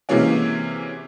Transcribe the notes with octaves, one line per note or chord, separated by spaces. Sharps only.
C3 E3 G#3 A#3 C#4 F#4